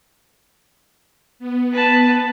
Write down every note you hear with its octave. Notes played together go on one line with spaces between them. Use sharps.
B3
B4 A5